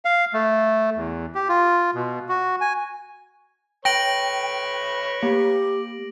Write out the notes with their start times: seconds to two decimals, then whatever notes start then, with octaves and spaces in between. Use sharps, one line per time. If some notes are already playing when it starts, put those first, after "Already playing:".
0.05 F5
0.33 A3
0.96 E2
1.35 G4
1.48 F4
1.95 B2
2.29 F#4
2.61 G#5
3.85 B4 C#5 G5 A#6 D7 F#7
5.23 A#3 G4